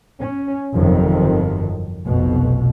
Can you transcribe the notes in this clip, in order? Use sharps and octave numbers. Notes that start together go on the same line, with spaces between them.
C#4
G1 F2 C3 D#3 F3 F#3
F1 B1 F2 B2